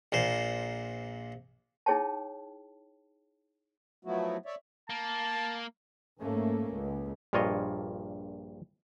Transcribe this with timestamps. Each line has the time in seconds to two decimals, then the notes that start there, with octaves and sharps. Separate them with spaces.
0.12 A#1 A#2 C5
1.86 D#4 E4 G#4 C#5 G5 A5
4.05 F3 F#3 A3 B3 E4 F#4
4.46 C#5 D5 E5
4.90 A#3 A5
6.20 G#2 A3 A#3 C#4
6.72 C#2
7.33 A#1 G2 A#2 F4 C#5 D#5